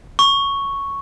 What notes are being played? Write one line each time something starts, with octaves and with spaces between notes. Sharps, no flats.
C#6